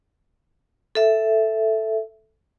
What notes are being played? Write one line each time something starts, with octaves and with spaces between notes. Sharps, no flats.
A4 E5